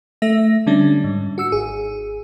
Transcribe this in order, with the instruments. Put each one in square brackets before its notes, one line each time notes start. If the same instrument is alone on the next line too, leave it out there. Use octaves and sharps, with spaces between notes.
[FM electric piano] A3 E5 A#6
D3 G3 C#4 D4
G#2
F#4 E6 C#7
G#1 G#4